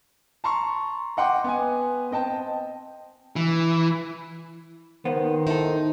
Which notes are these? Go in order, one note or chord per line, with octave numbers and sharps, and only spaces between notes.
A5 A#5 C6 C#6
D#5 F#5 G5 C6 D6
B3 G#5
C4 D#5 G5 A5
E3
D#2 D#3 A#3 B3 C5
D#4 E4 A4